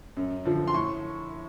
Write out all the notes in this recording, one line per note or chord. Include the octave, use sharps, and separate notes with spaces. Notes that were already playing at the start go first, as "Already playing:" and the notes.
F#2
D3 F3
C6
A2 C#6